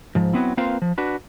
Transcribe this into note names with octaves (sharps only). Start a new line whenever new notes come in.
G#2 F3
F#3 B3 C4 E4
A#3 C4 F4 B4 C5 F5
F3
D4 F#4 B4